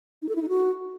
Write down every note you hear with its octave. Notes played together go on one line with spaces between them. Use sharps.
D#4
A4
E4
D#4
F#4